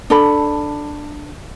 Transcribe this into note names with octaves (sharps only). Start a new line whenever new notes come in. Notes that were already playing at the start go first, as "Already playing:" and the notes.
D4 A4 B5